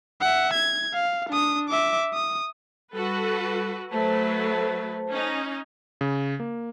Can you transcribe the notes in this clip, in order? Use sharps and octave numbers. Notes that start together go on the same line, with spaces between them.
E5 F#5
G#6
F5
D4 D#6
E5 D6
D#6
G3 F#4 A4 B4
F#3 A3 B4 C5 A5
C#4 D#4
C#3
A#3